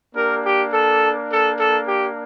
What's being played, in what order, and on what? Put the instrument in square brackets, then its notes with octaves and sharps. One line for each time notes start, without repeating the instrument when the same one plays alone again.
[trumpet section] A#3 D4 G4 A#4
G4
A4
A4
A4
G4